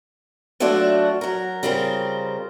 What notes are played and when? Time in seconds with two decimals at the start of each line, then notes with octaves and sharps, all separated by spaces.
0.60 F#3 A3 D4 F4 F#4 D5
1.21 F#3 A#4
1.63 C#3 G3 C4 F4 A#4